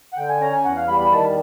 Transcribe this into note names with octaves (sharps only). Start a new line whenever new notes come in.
F#5
D3 G5
G#5
C#4 A#5
G#5
E2 F#5
F5
G3 B5
B5
D#3 A5